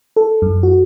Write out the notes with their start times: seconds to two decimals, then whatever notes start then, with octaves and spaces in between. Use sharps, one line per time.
0.16 A4
0.42 F#2
0.63 F#4